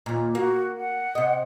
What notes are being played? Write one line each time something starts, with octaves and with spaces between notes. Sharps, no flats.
D#2 A#2
A#3 F#4
F#5
C3 D#5